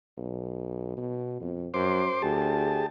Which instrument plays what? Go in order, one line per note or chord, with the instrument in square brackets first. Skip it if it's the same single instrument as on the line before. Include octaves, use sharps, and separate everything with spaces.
[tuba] B1
B2
F2
[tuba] F#2 [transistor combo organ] C5 C6 D6
[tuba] D2 [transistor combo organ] G4 G#4 A5